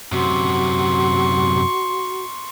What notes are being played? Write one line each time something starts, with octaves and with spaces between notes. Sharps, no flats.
F#2 C3 F#4 C6 C#6